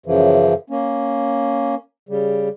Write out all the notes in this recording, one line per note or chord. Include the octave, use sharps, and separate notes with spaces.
F#2 C#3 E3 F3
A#3 C#4
C#3 G3